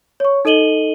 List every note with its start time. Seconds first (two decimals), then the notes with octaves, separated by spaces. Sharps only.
0.20 C#5 C#6
0.45 D#4 A4 D#5 D#7 F#7 G7